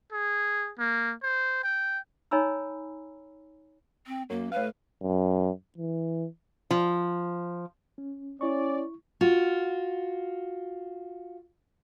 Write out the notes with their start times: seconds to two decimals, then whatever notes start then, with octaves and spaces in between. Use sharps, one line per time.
0.12 G#4
0.79 A#3
1.23 C5
1.63 G5
2.31 D#4 C#5 G#5 A#5 B5 E6
4.07 C4
4.30 F#2 A#3
4.52 A2 B4 F5
5.03 F#2
5.78 E3
6.71 F3
7.98 C#4
8.41 C#4 E4 D5 C#6
9.21 F4 F#4